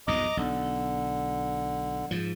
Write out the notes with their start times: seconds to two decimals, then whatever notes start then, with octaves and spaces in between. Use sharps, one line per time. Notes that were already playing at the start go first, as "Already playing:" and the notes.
0.08 B1 F2 G#2 D#5 A#5 D6
0.37 B1 D3
2.11 G#2 F3